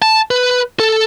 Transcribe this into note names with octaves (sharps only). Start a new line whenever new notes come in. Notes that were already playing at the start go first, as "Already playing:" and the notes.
A5
B4
A4